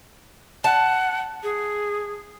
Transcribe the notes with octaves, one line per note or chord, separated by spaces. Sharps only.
F#5 A5
G#4